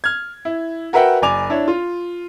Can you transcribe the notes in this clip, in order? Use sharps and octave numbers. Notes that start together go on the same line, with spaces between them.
F6 G#6
E4
F#4 A#4 B4 E5 F#5 G5
F#1 D5 G#5 D6 F7
D4 E4 C#5
F4